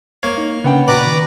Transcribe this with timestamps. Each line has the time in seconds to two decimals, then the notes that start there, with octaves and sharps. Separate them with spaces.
0.23 A#3 C#5 F5
0.38 D#4
0.64 C#3 B3 C#4 D4 F#5 G5
0.88 A#2 F#4 B4 D5 A#5 D6
1.06 D#3